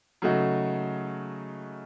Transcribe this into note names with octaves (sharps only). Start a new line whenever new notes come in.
C#3 F#3 A3 D#4 F#4